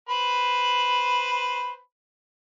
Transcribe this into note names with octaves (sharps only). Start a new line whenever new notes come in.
B4 C5 B5